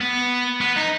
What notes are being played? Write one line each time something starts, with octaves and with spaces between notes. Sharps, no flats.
B3
B3
D#4